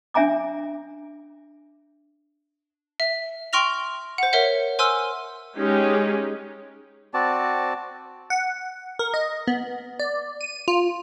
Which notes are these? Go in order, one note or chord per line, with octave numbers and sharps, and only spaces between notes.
C#4 D4 E5 G#5 A#5 D6
E5
G5 C6 C#6 F6 A#6 F7
C5 F#5
A#4 C#5 E5 F#5
C5 G#5 C6 E6 F6 D#7
G#3 C#4 D#4 G4 G#4
C4 F#4 D5 A5
F#5
A#4
D#5
B3
D5
D#7
F4